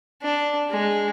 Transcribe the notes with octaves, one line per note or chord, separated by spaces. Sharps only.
D4
G#3